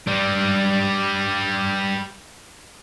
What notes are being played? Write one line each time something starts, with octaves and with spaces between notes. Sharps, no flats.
G3 D4